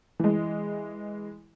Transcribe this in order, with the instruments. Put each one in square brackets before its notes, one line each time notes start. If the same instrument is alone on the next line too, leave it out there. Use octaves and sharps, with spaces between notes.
[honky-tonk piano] E3 G#3